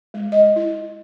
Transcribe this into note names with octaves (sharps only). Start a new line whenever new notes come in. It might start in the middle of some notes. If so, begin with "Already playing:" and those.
G#3
D#5
E4